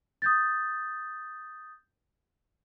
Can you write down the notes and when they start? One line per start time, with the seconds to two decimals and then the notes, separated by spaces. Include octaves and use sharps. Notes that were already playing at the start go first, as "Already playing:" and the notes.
0.22 D#6 G6 A6